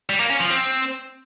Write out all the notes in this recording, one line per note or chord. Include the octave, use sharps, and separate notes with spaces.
G3
A#3
C#4
F3
C4